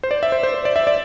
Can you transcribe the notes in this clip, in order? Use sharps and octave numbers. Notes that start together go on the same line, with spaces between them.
C5
D5
E5
C5
C5
C5
D5
E5
D5